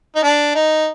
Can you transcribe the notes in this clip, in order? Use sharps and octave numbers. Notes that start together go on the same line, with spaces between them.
D#4
D4
D#4